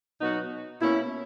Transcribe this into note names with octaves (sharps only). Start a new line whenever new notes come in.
B2 F#3 B3 D#4 F#4
B2 A#3 C#4 E4